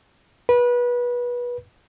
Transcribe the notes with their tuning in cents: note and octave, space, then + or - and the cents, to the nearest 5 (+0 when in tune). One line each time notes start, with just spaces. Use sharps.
B4 -25